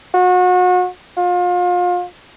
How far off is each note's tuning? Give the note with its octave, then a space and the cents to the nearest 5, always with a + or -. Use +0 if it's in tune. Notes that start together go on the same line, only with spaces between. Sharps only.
F#4 -35
F4 +35